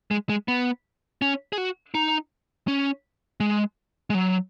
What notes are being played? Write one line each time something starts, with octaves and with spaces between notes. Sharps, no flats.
G#3
G#3
B3
C#4
G#4
F#4
D#4
C#4
G#3
G#3
F#3